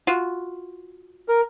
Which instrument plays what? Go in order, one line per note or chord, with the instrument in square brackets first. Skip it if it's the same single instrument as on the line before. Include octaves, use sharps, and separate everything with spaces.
[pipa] F4 F#4
[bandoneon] A#4